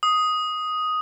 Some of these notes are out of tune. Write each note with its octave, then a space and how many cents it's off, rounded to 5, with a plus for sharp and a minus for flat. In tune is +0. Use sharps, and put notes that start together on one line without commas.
D#6 +5